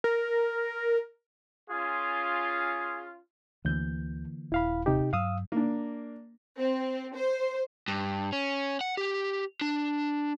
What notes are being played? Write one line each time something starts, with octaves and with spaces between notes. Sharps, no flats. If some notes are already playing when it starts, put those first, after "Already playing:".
A#4
C#4 F4 G#4
D2 D3 E3 A#3 G6
D#1 E4 F5 B5
C3 D#4 G4
G2 F#3 F5 D#6 E6
A#3 D4
C4
C5
G2
C#4
F#5
G4
D4